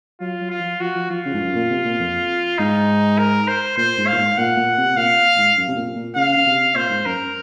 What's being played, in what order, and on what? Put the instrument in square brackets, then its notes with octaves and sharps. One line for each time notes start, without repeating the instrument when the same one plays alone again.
[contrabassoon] F#3 [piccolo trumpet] F4
[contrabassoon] F#3
[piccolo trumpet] F4
[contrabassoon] F3
[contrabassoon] F3 [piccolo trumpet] F#4
[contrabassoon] F3
[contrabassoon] F3 [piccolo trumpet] F4
[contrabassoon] C#3
G#2
F#2
A#2
C3
A#2
F2
[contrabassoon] G#2 [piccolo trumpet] D#4
[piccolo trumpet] A#4
C5
[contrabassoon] A#2 [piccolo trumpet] C5
[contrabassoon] G#2
[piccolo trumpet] F5
[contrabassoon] A#2
G#2
[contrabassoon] A#2 [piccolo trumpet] F#5
[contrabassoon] A#2
C3
[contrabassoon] A#2 [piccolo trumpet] F5
[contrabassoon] G#2
F#2
C3
A#2
A#2
[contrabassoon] C#3 [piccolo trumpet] F5
[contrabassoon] C#3
C3
[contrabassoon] A#2 [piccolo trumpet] C5
[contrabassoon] G#2
[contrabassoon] F#2 [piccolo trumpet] A#4